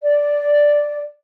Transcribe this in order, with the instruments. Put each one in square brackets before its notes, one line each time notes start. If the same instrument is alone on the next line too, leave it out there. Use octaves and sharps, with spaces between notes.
[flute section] D5